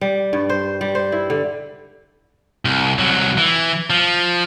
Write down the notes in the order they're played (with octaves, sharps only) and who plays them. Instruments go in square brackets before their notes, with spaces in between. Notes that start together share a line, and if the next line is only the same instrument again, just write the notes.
[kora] G3
G2
C5
G3
C5
E4
D3
[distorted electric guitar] C2
C2 F#3
E3
F3